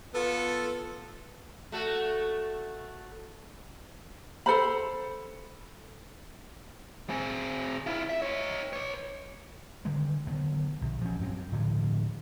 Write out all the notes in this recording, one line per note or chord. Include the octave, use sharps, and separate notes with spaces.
B3 F4 A4
A3 F#4 A4
A4 C5 B5
C4 G#4
E4 F4
E5
D#4 C#5
B4 C#5
D3 D#3 G3 G#3
D3 D#3 F#3 B3
A#1
F3 C#4
G2 F#3 B3 C4
A2 D3 E3 F3